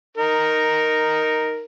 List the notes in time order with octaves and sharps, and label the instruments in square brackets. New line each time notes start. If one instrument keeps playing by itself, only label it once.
[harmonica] D#4 A#4